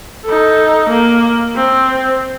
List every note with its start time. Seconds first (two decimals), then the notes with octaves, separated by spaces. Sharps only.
0.25 D#4 A4
0.89 A#3
1.56 C4